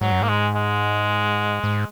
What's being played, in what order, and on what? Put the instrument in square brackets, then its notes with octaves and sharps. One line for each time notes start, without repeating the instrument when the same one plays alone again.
[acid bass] G#2 [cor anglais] F#3
[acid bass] F#2
[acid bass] G#2 [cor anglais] A#3
[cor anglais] G#3
G#3
[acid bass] G#2